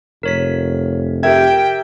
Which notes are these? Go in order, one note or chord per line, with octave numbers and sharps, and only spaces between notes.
F1 A#4 C#5 B6
G4 A#4 E5 G5 G#6